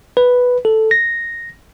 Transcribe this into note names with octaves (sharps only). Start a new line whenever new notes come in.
B4
A4
A#6